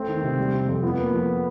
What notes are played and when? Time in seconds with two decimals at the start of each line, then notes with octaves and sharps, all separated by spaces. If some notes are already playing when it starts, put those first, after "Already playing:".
Already playing: A3 C4
0.08 D#3
0.23 C3
0.37 G3
0.53 C3
0.68 F2
0.83 B3 F4
0.99 A#3
1.13 F3